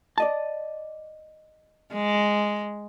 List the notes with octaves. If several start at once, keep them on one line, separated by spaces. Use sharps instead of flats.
D5 D#5 A5
G#3